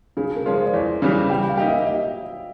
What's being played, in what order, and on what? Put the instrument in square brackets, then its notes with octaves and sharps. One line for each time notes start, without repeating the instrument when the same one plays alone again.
[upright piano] C#3 [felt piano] G#4
[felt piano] A#4
[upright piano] F3 G#3 C#4 F4
[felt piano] C5
D5
[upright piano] E2 [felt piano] C#5
[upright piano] C#3 E3 G3
[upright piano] G3 [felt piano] G5
[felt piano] F5
[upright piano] A#3 D#4 G4
[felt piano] E5
D#5